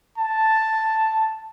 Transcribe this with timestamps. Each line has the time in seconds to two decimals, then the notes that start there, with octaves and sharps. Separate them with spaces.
0.18 A5